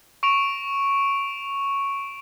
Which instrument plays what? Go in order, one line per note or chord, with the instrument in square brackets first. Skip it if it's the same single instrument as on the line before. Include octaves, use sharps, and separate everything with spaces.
[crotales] C#6 D7 F7